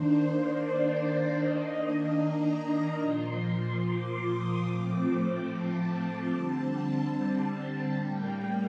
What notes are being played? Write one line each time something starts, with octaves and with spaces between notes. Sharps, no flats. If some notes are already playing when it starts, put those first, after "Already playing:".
Already playing: D#3 A#3 D4 C5
D5
D#3 A#3 D4 D#5
A#5
A#2 F3 A#3 C6
C6
D6
D#6
A2 F3 A3 C4 D6
A5
D3 G3 C4
A2 G3 A#3 G5